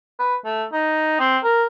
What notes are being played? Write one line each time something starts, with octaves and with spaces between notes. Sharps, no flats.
B4
A3
D#4
C4
A#4